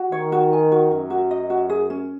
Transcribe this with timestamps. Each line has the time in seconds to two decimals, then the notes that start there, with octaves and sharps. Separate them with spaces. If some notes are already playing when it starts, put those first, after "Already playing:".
Already playing: F#4
0.12 D#3 C#5
0.32 F#4
0.53 G#5
0.72 F#4
0.91 F#2 A#4
1.10 F#4
1.31 D#5
1.50 F#4
1.70 G#4
1.90 C#4